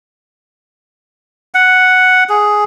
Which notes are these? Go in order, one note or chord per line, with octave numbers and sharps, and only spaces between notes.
F#5
G#4